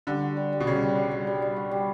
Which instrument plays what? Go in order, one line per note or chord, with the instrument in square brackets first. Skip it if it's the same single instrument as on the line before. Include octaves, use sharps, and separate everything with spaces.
[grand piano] D3 [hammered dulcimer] G3
[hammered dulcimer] F#4
G3
G3
[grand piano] B2
[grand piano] C#3 [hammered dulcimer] G3
[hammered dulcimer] G3
G3
G3
G3
G3
F#4
G3